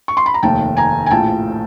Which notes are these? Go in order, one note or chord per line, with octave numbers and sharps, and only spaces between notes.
C#6
C6
B5
A#5
F1 D#2 D#3 G5 A5
G#5 A#5
G#5
A#1 A2 F3 G5 A5